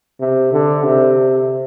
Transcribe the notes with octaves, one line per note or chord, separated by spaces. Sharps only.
C3
D3
C3